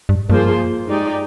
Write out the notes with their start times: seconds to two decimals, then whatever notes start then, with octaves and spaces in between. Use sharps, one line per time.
0.09 G2
0.29 G2 F3 A#3 F4 G#4 C5
0.88 G#3 D#4 G4 D5